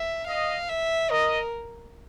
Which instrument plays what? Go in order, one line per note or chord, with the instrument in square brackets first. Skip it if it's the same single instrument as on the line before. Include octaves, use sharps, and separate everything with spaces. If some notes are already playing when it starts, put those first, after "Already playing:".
Already playing: [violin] E5
[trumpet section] D#5 [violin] F5
[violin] E5
[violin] A#4 [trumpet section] D#5